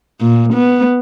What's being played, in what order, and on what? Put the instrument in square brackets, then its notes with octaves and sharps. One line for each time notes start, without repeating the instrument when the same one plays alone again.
[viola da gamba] A#2
B3